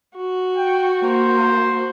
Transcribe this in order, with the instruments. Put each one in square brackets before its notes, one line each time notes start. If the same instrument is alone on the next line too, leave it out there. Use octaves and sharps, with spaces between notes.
[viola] F#4
[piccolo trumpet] G5
[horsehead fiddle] A#3 [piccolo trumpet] C5